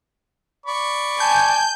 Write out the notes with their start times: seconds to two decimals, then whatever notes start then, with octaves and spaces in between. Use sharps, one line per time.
0.66 D5 B5 C#6
1.20 G#5 A5 G6